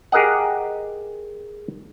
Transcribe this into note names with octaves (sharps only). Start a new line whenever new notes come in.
G4 G#4 A#4 D#5 F#5